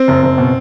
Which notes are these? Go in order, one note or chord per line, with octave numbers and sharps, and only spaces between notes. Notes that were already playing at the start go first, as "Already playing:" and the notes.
Already playing: C4
F#1
F#1
B2